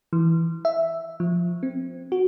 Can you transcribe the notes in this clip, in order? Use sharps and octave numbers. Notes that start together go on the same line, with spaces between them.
E3
E5
F3
C4
F#4